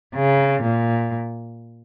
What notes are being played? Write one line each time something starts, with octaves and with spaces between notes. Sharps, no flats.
C#3
A#2